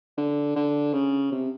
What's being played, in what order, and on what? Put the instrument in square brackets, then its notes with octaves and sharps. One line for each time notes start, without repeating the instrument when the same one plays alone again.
[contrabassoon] D3
D3
C#3
C3